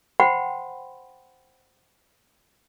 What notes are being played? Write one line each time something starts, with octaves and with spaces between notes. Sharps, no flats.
C5 F#5 G5 B5 C6